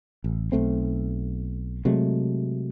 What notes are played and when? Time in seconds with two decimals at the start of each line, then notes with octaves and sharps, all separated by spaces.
0.24 A1
0.52 B1 A3 C4
1.85 C3 F#3 G#3 A3